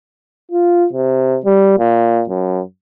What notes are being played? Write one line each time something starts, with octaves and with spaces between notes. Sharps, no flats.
F4
C3
G3
A#2
F#2